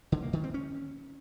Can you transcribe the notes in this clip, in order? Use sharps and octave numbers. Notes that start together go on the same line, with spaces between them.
D3
A#3
D#3
C4
C#4